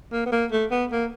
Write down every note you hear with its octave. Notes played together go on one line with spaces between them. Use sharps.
A#3
B3
A#3
A3
B3
A#3